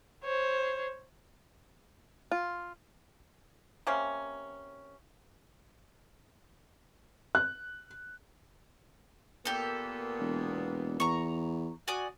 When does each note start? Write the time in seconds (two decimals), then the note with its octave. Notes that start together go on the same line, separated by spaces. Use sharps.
0.24 C5 C#5
2.32 F4
3.87 C3 A#3 C#4
7.35 F#6
9.45 A#2 A#3 B3 G4 A4
10.19 E1
11.00 E2 A#5 C#6
11.88 F#4 D5 G#5 D#6